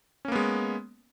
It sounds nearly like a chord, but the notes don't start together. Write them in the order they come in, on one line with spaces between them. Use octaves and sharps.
C#4 A#3 B3 G#3